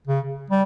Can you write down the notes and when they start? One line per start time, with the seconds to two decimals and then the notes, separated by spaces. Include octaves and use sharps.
0.07 C#3
0.50 G3